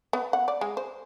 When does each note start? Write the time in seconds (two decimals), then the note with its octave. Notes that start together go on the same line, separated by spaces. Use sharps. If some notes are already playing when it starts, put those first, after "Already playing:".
0.13 B3
0.33 F#5
0.48 D5
0.61 G#3
0.77 C5